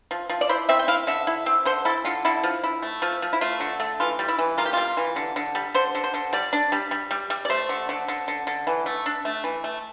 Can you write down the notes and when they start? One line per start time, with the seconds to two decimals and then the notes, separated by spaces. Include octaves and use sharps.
0.11 F3
0.29 F3
0.41 D5
0.49 E4 C5
0.69 C4 E5
0.79 G5
0.88 E4 F5
1.07 D3 E5
1.27 E4
1.46 C4
1.65 D3 C5
1.85 E4 A4
2.05 D3 F4
2.25 D3 E4
2.43 F3
2.64 E4
2.82 A3
3.02 F3
3.22 F3
3.33 E4
3.41 A3 F4
3.60 D3
3.80 A3
4.00 E3 F4
4.19 G3
4.29 E4
4.39 E3
4.58 A#3 F4
4.65 G4
4.73 G3 F4
4.97 E3
5.16 D3
5.36 D3
5.55 G3
5.74 D3 C5
5.95 D3
6.04 C5
6.14 D3
6.33 G3 D5
6.53 D4
6.72 G3
6.91 G3
7.11 G3
7.30 G3
7.45 D5
7.50 A3 C5
7.69 D3
7.89 D3
8.08 D3
8.28 D3
8.47 D3
8.67 E3
8.86 A3
9.06 D4
9.25 A3
9.44 E3
9.64 A3